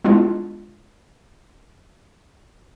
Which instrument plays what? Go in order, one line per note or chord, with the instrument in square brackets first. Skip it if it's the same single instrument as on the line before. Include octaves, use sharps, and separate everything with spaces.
[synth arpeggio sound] G#3 B3 D4 E4 F4